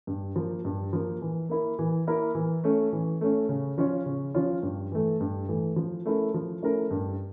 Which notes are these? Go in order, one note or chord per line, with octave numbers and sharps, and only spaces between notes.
G2
F3 A#3
G2
F3 A#3
E3
A#3 E4 A#4
E3
A#3 E4 A#4
E3
A3 C#4
E3
A3 C#4
C#3
F3 C#4 F4 C#5
C#3
F3 C#4 F4 C#5
G2
E3 A3
G2
E3 A3
F3
A3 C#4 E4 A#4
F3
A3 C#4 E4 A#4
G2